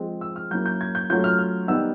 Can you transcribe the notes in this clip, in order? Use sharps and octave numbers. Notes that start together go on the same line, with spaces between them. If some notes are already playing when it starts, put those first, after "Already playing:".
Already playing: F3 G#3 C4
E6
F6
F#3 A#3 C#4 E4 G6
G6
G#6
G6
F#3 A3 C#4 F4 G6
F6
F6
D#3 G3 B3 D#4 E6